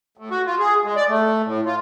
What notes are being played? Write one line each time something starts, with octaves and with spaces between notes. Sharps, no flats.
A2
F#4
F4
G#4
G#3
D5
A3
A2
F4